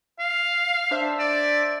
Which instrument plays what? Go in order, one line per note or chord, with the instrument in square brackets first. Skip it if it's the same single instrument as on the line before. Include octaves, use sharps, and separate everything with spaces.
[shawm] F5
[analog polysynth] D4 C5 E5
[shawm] D5